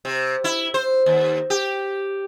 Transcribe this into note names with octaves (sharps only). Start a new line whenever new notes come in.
C3
E4
C5
D#2
G4